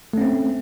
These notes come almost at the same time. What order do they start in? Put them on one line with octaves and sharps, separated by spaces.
A3 C#4 C4